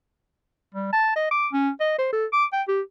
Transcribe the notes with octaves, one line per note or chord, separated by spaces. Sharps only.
G3
A5
D#5
D6
C#4
D#5
C5
A4
D6
G5
G4